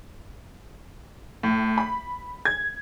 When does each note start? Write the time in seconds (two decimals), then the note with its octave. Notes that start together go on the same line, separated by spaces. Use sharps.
1.43 A2
1.78 B5
2.45 G#6